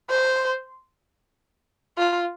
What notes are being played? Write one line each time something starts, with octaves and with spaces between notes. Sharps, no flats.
C5
F4